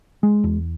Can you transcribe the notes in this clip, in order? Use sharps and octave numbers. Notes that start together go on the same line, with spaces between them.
G#3
E2